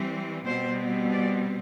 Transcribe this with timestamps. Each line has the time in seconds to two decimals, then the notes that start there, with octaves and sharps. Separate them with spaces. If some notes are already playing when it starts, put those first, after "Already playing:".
Already playing: E3 G3 C4
0.45 B2 G3 C4 C5
1.11 D5